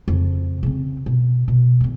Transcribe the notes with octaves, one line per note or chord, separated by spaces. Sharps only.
F2 C#3
C#3 C4
B2
B2
E2 D3